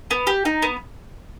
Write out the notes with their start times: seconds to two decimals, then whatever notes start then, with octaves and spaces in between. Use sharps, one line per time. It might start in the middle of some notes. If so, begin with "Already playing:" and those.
0.11 B3
0.27 G4
0.45 D#4
0.62 B3